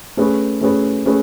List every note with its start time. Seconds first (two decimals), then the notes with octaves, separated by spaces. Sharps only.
0.17 A3 C#4 G#4 B4
0.61 A3 C#4 G#4 B4
1.06 A3 C#4 G#4 B4